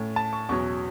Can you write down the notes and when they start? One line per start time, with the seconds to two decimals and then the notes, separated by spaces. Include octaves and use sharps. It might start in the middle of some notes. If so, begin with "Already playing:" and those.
Already playing: A2 A3 C#4
0.16 A5
0.33 C#6
0.49 E2 B2 F#3 C#4 C#6